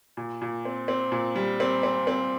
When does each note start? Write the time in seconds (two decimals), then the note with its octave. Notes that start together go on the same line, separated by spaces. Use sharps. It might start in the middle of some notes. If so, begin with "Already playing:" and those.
0.17 A#2
0.42 A#2
0.65 C4
0.88 C4
1.12 A#2
1.36 G3
1.60 C4
1.83 C4
2.07 C4